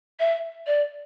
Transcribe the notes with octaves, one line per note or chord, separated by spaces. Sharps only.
E5
D5